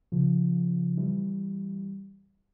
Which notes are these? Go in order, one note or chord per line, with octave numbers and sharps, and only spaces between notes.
C#3 F3
E3 G3